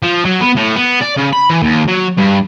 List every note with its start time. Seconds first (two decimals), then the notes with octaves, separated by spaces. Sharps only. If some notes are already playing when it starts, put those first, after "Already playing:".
0.03 F3
0.25 F#3
0.40 B3
0.56 A2
0.76 B3
1.01 D5
1.17 C#3
1.33 B5
1.50 E3
1.63 D#2
1.88 F#3
2.17 G2